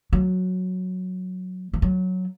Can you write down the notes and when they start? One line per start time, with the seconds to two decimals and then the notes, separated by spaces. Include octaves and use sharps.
0.13 F#3
1.73 E3
1.82 F#3